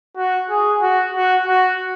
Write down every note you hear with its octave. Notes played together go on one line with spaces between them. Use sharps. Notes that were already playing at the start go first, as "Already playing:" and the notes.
F#4
G#4
F#4
F#4
F#4